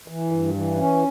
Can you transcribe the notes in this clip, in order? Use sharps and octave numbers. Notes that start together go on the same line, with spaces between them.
E3
G2
E3
C#4